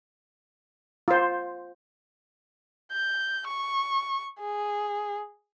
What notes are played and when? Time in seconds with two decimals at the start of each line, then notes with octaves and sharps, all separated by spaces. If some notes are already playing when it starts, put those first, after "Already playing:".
1.08 F4 C5
2.92 G6
3.48 C#6
4.40 G#4